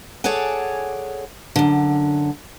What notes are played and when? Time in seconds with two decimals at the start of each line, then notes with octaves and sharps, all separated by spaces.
0.24 G#4 A4 C#5 D5 F#5 G#5
1.56 F#2 D3